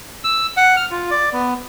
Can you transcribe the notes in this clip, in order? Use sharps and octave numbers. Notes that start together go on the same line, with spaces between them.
E6
F#5
F6
F4
D5
B3